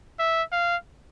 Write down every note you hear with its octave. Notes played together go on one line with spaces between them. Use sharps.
E5
F5